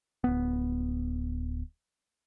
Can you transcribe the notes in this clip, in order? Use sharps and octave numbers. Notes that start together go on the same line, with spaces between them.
D1 B3